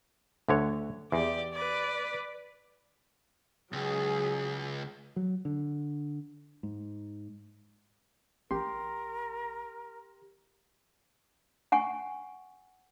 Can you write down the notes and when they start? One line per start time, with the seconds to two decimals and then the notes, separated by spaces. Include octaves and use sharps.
0.49 D2 D3 C#5
1.12 E2 G4 D5
1.54 B4 D5
3.73 C#2 F#3 G#4
5.16 F#3
5.45 D3
6.63 G#2
8.51 A1 G4 A#4 C6
11.72 F#5 G#5 C#6